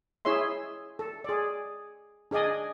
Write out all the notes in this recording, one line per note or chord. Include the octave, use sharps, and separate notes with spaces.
E4 G#4 C#5 E5 C6
A4
G#4 D5
D4 G#4 D5 D#5 G#5